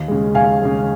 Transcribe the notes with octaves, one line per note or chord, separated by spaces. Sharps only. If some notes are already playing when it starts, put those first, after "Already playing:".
Already playing: D#2 D#5
C#3 G#3
D#2 F5 G#5
C#3 G#3